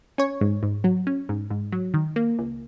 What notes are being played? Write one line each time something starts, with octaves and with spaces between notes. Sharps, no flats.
C#4 C#5
G#2
G#2
F#3
C#4
G#2
G#2
F#3
D#3
A#3
C#2